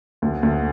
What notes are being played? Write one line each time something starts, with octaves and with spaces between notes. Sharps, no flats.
D2
D2